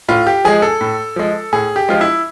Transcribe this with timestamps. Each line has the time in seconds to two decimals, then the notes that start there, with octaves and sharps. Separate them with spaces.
0.08 A2 F4
0.27 G4
0.44 F3 G#3 G#4
0.62 A4
0.81 A2
1.16 F3 G#3
1.52 A2 G#4
1.76 G4
1.89 F3 G#3 F4
2.01 E4